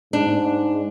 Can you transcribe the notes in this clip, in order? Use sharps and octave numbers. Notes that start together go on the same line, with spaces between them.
G#2 D4